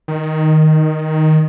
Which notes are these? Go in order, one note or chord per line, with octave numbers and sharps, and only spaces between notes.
D#3